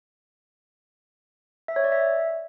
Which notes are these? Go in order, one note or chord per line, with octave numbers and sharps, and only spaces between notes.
E5
C#5
D5
E5